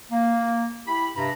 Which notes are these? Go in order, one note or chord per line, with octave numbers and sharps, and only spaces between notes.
A#3
E4 G4 B5
G2 C3 A#5 B5